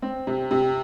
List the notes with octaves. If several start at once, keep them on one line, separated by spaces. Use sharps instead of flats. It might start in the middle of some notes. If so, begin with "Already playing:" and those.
C4
C3
C3